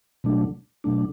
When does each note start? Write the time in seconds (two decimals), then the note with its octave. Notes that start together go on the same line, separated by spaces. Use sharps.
0.24 B2 F#3 A3 D4
0.84 B2 F#3 A3 D4